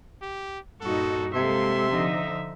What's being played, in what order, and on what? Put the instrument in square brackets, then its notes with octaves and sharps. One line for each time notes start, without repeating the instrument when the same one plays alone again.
[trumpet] G4
[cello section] G2 A#2 D#4 [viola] F#4 [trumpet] A4
[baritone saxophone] C3 [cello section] G#3 A#3 A4 [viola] E5 [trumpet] C6
[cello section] D3 F3 D#4